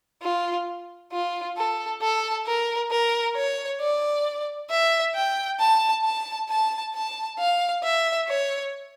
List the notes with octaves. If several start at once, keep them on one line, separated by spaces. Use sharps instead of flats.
F4
F4
A4
A4
A#4
A#4
C#5
D5
E5
G5
A5
A5
A5
A5
F5
E5
C#5